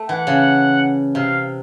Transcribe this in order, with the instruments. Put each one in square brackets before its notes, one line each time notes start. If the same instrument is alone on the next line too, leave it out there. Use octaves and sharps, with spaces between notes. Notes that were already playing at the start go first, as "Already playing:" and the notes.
Already playing: [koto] A3
[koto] E3 [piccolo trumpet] F#5
[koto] C#3
[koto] C3 [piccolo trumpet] F5